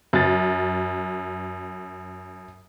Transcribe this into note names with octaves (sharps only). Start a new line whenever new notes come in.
F#2 A6